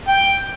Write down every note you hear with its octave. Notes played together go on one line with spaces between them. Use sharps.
G5